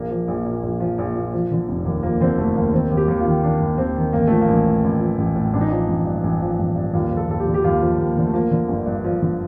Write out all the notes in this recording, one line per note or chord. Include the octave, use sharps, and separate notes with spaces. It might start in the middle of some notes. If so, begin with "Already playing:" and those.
Already playing: A#1 A#3
F3
A#1
A#2
A#1
F3
A#1
A#2
F3
D3
F1
D#2
F3 A#3
D3 C4
F1 A3
D#2 A#3
D#3 C4
D#2
G4
D#2
F4
D#3
D#3 D4
D#2
D#2 C4
D#3
A1 A#3
F3 A3
A#3
A1
A2
A1
F3
A1
A2
A1 D4
D#4
F3 D4
A1
G2
A1 D4
F3
A1
G2
D#2 F4
F3
A4
D#2 A4
G4
D3
G4
D#2 F4
F3
D#2
D3
A3
F3 A#3
D3
G1
G2
F3
D3